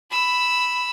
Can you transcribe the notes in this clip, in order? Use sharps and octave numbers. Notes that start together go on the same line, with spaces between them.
B5 E6